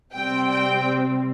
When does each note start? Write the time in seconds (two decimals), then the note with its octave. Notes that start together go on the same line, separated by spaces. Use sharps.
0.13 C3 G3 C4 G5
0.49 G5